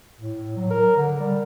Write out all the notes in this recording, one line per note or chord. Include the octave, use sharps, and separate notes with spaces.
A2
F#3
A#4
D3
G3